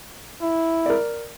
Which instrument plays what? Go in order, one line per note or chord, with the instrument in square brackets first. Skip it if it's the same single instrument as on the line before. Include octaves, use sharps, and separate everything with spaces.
[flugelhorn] E4
[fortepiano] A#4 D5